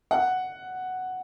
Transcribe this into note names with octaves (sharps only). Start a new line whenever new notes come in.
F#5